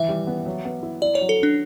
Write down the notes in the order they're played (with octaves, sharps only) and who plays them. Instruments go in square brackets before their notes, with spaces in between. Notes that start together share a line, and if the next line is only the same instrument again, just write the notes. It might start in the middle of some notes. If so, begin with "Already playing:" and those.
Already playing: [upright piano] E3 [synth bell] E5
[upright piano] G3
B3
F#3
B3
E4
[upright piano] E4 [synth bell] D5
[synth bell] C#5
[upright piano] F#3
[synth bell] A4
[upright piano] C#4 [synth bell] D4